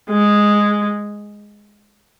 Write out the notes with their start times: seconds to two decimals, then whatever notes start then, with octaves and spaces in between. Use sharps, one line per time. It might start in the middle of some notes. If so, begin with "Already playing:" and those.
0.10 G#3